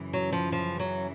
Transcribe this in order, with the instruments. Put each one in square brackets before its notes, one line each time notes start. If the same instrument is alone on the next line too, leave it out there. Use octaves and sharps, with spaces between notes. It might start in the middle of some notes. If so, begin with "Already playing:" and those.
Already playing: [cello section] F#2 C#3 E3
[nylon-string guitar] F#3
F3
F3
F#3